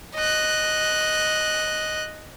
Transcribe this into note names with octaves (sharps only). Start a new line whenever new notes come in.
D#5 F#6